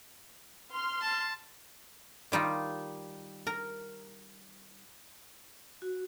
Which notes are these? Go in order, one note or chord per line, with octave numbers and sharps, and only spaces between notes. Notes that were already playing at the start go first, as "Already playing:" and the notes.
C6 F6
A5
D#3 G3 D#4 F4
A#4 A#5
F#4